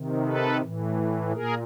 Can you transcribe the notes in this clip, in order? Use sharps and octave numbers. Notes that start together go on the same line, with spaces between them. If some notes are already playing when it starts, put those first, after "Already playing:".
Already playing: C3 D#3
A4 B4
A2 E3
A#2 G#4 A#4